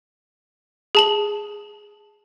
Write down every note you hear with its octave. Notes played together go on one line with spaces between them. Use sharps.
G#4 A5 F#7